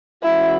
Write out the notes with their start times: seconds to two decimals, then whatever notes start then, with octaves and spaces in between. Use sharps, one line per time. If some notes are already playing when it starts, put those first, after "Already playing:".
0.23 E3 G#3 C#4 E4 F#4